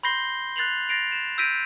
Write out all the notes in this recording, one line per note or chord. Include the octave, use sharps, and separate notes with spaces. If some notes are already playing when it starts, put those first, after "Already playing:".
B5 C6 G6 A#6 C7 G7
F#6 A6 C7 F7 F#7
A6 A#6 C7 D7 F7
E7
E6 G6 A#6 B6 D7 D#7